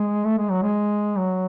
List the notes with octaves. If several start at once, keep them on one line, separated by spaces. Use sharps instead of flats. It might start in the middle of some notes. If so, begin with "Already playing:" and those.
Already playing: G#3
A3
G#3
F#3
G#3
F#3